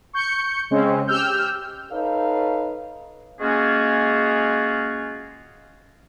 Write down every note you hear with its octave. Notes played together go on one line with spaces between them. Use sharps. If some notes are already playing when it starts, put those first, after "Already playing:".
C#6 G6 C#7
C#3 G#3 C4 C#4
G4 E6 F6 G6
D#4 A4 B4 C#5 F5
G#3 A#3 C#4 F4 F#4 G#4